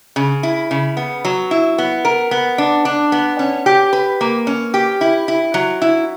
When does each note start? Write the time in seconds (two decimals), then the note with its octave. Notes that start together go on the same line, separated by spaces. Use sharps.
0.16 C#3
0.43 E4
0.71 C#3
0.97 B3
1.25 F#3
1.51 E4
1.78 B3
2.05 A#4
2.31 B3
2.58 D4
2.85 D4
3.12 B3
3.39 C#4
3.66 G4
3.93 B4
4.21 A#3
4.47 C#4
4.74 G4
5.01 E4
5.28 E4
5.54 F#3
5.82 E4